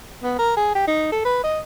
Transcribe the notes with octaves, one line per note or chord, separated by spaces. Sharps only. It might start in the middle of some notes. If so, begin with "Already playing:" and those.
B3
A#4
G#4
G4
D#4
A4
B4
D#5